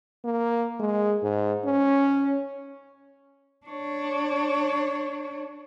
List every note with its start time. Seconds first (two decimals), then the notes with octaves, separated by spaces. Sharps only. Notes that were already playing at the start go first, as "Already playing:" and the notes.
0.24 A#3
0.80 G#3
1.23 G#2
1.64 C#4
3.66 D4 C#5